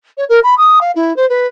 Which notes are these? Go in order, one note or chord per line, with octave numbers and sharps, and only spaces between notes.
C#5
A#4
B5
D#6
F5
E4
C5
B4